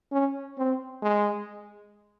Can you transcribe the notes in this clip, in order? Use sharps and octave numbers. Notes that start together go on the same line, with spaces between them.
C#4
C4
G#3